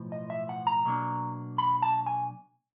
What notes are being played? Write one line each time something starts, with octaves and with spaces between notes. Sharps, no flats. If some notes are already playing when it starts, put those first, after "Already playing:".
Already playing: B1 A2 F3
D#5
E5
F#5
A#5
B2 F#3 A#3 D4
B5
A5
G#5